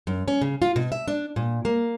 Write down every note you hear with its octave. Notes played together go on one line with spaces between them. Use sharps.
F#2
C#4
C#3
F4
B2
E5
D4
A#2
A#3